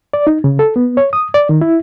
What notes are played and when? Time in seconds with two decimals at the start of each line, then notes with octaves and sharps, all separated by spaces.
0.13 D5
0.27 D#4
0.44 C#3
0.59 A4
0.76 B3
0.97 C#5
1.13 D#6
1.34 D5
1.49 D#3
1.61 E4